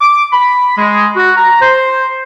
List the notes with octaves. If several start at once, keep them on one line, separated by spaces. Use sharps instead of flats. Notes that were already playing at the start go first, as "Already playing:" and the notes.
D6
B5
G#3
F#4
A#5
C5